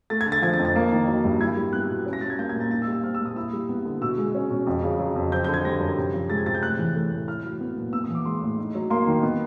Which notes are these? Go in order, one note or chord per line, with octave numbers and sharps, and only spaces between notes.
A3 A6
G#6
D3
A6
F3 G#6
A6
F2
A6
A#3
D#3
F#3
G2
E4 G#6
G3
B3 F#6
B2
C#4
A#6
G3 A6
G#6
A#3 G6
G#6
A#2
A6
D#4 A6
E6
G3
E6
C4 F6
E6
A#2
D#6
E4 E6
G3
B3
D3
B2 E6
G#3
C#4
B2
F2
C#3
F#3
F2
C4 G6
D3 G6
G#6
G3 A#6
F#2
C3
F3
G#3 A6
G#6
C3 A6
G6
A2 F#6
E3
A3
A2
E4 F6
F#3
B3
A#2
B3 E6
D#6
E3
D6
G#3 C6
A2
D#4
F#3
A#3 C6
D#3
B3